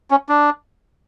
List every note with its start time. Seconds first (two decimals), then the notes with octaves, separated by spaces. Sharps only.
0.11 C#4
0.29 D4